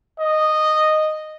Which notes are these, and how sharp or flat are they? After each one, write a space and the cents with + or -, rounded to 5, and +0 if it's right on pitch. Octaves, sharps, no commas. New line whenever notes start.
D#5 -10